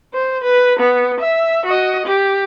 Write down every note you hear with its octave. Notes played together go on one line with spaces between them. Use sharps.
C5
B4
B3
E5
F#4 D#5
G4